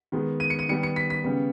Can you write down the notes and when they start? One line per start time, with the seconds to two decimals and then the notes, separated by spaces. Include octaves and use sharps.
0.12 D#3 G#3 B3
0.40 D#7
0.50 C#7
0.59 D#7
0.69 D#3 G3 B3 C#7
0.83 C#7
0.96 B6
1.10 B6
1.24 C#3 G3 B3